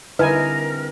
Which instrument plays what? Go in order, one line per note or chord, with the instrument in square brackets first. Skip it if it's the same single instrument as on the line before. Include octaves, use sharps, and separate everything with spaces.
[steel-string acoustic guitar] D3 G3 C4 [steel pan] D#4 E4 G#5 [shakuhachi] A#4 [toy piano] B4